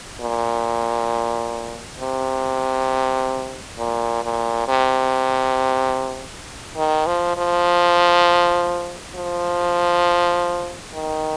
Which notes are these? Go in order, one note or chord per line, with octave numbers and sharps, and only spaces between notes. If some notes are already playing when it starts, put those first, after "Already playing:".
A#2
C3
A#2
A#2
C3
D#3
F3
F3
F3
D#3